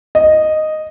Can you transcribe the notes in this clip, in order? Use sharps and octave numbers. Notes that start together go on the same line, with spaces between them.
D#5